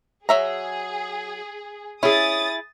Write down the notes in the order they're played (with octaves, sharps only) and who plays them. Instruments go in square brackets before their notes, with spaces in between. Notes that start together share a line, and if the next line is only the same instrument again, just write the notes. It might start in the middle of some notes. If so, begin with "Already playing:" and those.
[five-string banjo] F#3 E5 A#5 [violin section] G#4
[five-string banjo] C#4 [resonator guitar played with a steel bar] E4 G#4 [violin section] D#6 A6